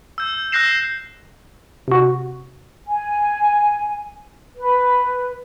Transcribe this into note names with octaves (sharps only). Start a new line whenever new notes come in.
E6 G6
E6 F#6 G6 A#6 C7 E7
C3 F#4
G#5
B4